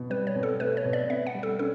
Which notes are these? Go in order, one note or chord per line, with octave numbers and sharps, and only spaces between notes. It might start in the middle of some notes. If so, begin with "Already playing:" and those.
Already playing: B2
G3 B4
C#5
B2
A4
A3 B4
C#5
B2
D5
B3 E5
F#5
G3
A4
C#4 A4